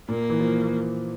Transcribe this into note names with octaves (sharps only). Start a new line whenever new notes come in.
A#2 A#3
E3
F3